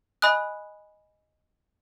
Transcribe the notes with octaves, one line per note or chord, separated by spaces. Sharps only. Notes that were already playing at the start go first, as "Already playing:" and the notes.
D#5 G#5 B5 D#6 F#6